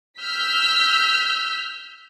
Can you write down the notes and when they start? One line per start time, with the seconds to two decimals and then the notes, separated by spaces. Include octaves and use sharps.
0.18 E6 F6 G6 B6